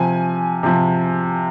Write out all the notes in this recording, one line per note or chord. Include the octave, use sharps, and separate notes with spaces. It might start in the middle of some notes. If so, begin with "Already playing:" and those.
Already playing: C3 F3 G#5
C3 F3